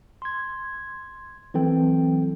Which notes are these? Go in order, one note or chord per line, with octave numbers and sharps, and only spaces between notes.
C6 G#6
E3 F#3 C4 A4 G5